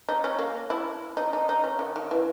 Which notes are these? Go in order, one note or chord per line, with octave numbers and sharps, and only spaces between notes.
D#4
C#4
A#3
E4
D#4
D#4
D#4
C#4
D#3
D#3
E3